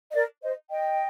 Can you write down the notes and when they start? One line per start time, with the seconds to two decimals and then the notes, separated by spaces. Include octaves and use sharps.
0.10 D#5
0.14 A#4 D5
0.42 C5 D#5
0.69 D#5 G5